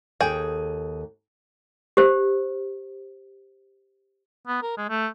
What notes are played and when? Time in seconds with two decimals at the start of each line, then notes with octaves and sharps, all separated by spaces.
0.20 D#2 G#4 A4 G5
1.97 G4 C5
4.47 B3
4.62 A#4
4.77 G#3
4.89 A3